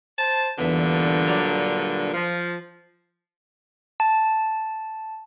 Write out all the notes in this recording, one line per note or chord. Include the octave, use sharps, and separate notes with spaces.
C5 A5
E2 G2 A#2 D3 E5
F#3 D5
F3
A5